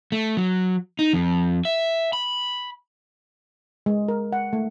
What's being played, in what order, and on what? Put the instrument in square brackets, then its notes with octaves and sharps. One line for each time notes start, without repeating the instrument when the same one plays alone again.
[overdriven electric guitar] A3
F#3
D#4
F2
E5
B5
[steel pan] G#3
A#4
F#5
A3